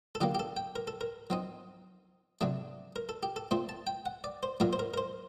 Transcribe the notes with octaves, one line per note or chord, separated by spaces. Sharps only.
A4
D3 F#3 A#3 G4
G4
A4
G5
A#4
A4
A#4
F#3 C4 D#4
C3 F#3 A3 D4
A#4
A4
G4
A4
A#2 A3 C4 C5
A5
G5
F#5
D5
C5
A#2 F#3 A3 D4 A#4
C5
A#4
A#4
C5